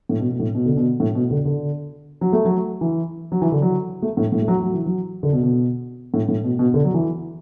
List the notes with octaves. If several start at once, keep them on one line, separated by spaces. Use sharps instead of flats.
A2
B2
B2
A2
B2
D3
B2
A2
B2
D3
D3
F#3
A3
F#3
E3
F#3
E3
D3
F#3
A3
A2
A2
A3
F#3
F#3
E3
F#3
D3
B2
B2
A2
A2
B2
B2
D3
F#3
E3